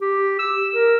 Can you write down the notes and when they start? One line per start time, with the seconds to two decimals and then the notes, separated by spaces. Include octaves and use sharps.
0.01 G4
0.39 E6
0.75 A#4